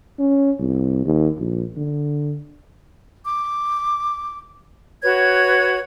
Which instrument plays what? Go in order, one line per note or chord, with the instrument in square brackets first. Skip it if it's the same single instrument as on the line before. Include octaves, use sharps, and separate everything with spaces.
[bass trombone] C#4
C2
D#2
A#1
D3
[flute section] D6
F#4 B4 C#5 G#6